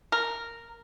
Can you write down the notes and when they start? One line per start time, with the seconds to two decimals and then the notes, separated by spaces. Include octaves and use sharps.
0.12 A#4